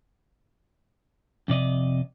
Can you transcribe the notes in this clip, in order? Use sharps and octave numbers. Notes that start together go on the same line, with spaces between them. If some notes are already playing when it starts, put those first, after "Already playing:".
F2 C3 D5 D#5